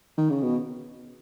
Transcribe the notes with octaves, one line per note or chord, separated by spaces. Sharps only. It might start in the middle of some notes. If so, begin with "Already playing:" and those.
D#3
C#3
B2